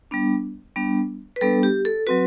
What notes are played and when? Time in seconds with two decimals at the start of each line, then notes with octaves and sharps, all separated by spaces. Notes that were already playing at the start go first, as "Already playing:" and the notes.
0.11 G3 B3 D4
0.76 G3 B3 D4
1.36 B4
1.41 G3 B3 D4 A4
1.63 G4
1.85 A4
2.07 F#3 C4 F#4 B4